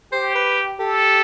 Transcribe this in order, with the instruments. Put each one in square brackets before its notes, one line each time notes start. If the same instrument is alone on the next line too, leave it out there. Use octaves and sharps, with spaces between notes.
[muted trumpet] G4 [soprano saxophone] C5
[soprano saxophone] B4
[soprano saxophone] G4 [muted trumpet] A4